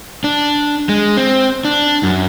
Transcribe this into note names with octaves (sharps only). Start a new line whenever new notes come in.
D4
G#3
C4
D4
F#2